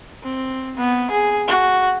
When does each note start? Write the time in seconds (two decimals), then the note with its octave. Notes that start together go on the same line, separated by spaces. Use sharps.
0.23 C4
0.77 B3
1.11 G#4
1.47 F#4